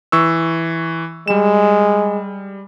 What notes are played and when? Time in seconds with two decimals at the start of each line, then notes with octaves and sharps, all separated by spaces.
0.12 E3 C#6 E6
1.28 G3 G#3 E7